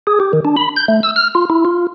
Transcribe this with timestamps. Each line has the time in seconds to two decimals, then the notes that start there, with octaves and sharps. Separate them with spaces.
0.07 G#4
0.20 G4
0.33 D#3
0.45 D4
0.57 B5
0.76 G6
0.88 A3
1.03 E6
1.16 F6
1.35 F4
1.50 E4
1.65 F4